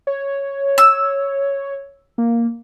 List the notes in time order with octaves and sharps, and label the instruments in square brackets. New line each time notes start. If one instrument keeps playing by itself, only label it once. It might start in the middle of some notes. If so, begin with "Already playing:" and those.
[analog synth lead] C#5
[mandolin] E6
[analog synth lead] A#3